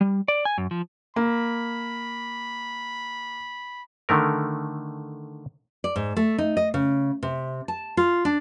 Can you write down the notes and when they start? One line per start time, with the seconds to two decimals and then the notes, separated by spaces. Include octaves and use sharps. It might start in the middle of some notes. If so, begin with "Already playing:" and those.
0.01 G3
0.28 D5
0.45 G#5
0.58 F#2
0.71 F3
1.16 A#3 B5
4.09 D3 D#3 A3 A#4
5.84 D5
5.96 G#2
6.16 A3
6.38 D#4
6.57 D#5
6.74 C#3
7.23 C3
7.68 A5
7.97 F4
8.25 D4